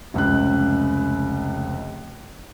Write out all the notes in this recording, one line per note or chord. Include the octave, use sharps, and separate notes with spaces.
F1 C#2 C#3 F#6